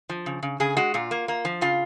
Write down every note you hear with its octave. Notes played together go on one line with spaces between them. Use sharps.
F3
C#3
C#3
C#3 G#4
G#3 F#4
A#2 F4
A#3
A#3
F3
C#3 F4